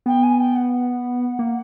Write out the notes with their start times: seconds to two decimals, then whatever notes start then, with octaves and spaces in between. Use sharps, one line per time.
0.06 B3 G5
0.23 G#5
0.40 G5
0.55 F#5
0.72 F#5
1.39 A#3